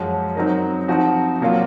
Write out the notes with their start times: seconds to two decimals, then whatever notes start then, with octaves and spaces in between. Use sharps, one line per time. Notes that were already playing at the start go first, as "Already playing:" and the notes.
Already playing: F#2 F3 G#3 C#4 F#4
0.35 F#3 C4 D#4 A#4
0.88 F3 C4 D#4 F#4
1.41 A#2 F#3 A#3 F4